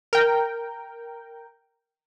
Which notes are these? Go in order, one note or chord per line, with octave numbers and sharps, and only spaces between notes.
A#4 G5